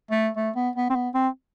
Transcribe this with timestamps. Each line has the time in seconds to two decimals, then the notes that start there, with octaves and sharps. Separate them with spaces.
0.11 A3
0.36 A3
0.56 B3
0.76 B3
0.90 C4
0.95 B3
1.14 C4